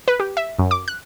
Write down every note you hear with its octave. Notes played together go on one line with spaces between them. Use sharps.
B4
G4
E5
F#2
D6
F#6